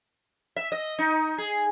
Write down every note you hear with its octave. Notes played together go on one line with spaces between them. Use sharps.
E5
D#5
D#4
G#4